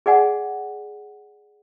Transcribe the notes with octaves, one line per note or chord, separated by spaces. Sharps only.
G#4 D5 F#5 G#5